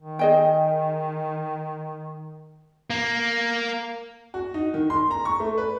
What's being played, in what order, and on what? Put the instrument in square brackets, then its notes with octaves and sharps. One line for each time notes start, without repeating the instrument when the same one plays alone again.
[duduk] D#3
[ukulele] G#4 D#5 G5
[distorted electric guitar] A#3
[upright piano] F#4
D#4
D#3
C6
A#5
C#6
A3
B4